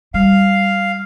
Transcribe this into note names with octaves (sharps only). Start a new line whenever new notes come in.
G3 F5